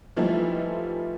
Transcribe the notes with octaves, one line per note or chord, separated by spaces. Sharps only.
E3 F3 G3 A3 D#4 E4